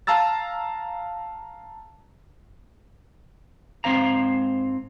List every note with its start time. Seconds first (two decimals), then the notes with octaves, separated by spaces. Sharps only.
0.07 F5 A5 A#5 E6 A6
3.84 G#2 G#3 C4 C5 F5 A#5